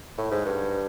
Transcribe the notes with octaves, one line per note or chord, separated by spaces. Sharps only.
A2
G#2
G2